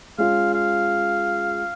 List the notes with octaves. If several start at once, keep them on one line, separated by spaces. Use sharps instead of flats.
G#3 C#4 F4 F5
F5